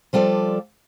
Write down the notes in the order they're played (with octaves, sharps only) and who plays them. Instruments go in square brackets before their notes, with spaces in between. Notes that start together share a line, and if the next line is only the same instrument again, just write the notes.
[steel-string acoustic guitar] F3 G3 F4 A4 D5